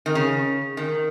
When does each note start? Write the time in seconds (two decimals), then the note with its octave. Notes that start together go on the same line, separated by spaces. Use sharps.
0.06 D#3
0.15 C#3
0.77 D#3